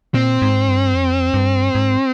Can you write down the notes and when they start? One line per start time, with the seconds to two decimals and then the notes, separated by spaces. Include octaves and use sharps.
0.14 A#2 C4
0.42 G#2
0.68 G2
0.94 F2
1.34 G2
1.75 G#2